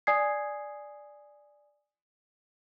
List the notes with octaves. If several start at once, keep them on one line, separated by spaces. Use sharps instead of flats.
D5 G#5 D#6 G#6 C7